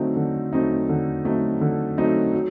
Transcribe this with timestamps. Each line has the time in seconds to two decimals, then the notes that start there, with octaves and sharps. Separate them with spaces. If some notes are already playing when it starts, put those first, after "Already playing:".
Already playing: D3 F#3 A3 C4 D#4
0.16 D3
0.53 F#3 A3 C4 D#4
0.89 D3
1.25 F#3 A3 C4 D#4
1.61 D3
1.98 F#3 A3 C4 D#4
2.34 F#3